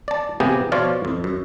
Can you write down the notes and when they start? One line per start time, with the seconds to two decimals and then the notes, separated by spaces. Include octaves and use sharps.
0.08 D5 A5
0.40 C3 A#3 B3 G4 G#4
0.72 B2 F3 F4 C#5 D5 F5
1.05 F2
1.24 F#2